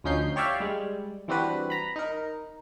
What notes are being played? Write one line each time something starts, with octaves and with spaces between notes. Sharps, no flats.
D2 F3 C#4 D#4 G6 C7
G4 C#5 D5 E5 F5 G5
G3 G#3
E3 G3 C4 D4 F#4 B4
A#5 B5
D#4 A#4